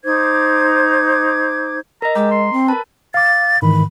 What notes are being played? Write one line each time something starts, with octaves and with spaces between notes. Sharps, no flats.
D#4 C5 D6 G#6
A#4 D#5 A#5
G#3 G4 A#5
C6
C4
A#4 B4 A5
F5 D6 A6
G#2 D#3 E3 B5